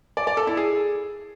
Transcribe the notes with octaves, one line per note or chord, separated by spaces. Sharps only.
D5
D5
A4
E4
G#4